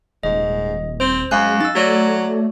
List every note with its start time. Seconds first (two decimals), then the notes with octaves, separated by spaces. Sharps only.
0.23 D#1 G#2 D#5
1.00 C4 C5
1.31 F#2 G#3 F5 G#5 F#6
1.61 D#4 E6 A6
1.75 F#3 A3 F#4 C#5 D5